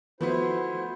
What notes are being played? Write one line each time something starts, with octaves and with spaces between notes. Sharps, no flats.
F3 A3 B3 E4 F#4 B4 C5